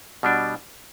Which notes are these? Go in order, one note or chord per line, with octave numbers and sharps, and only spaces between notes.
B2 G3 D4